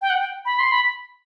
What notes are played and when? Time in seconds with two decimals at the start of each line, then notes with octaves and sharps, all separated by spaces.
0.02 G5
0.10 F#5
0.19 G5
0.45 B5
0.59 C6
0.72 B5